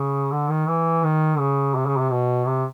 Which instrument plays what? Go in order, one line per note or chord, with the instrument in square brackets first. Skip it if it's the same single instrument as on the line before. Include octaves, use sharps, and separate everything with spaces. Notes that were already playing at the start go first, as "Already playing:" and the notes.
Already playing: [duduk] C#3
D3
D#3
E3
D#3
C#3
C3
C#3
C3
B2
C3